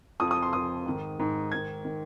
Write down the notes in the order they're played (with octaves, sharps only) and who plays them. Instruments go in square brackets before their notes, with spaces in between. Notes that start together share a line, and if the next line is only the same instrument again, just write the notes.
[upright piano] F2 F3 D#6
D#6
C6
F2 F3 D#6
G#2 D#3
G#2 D#3
G#2 D#3 G#6
D#3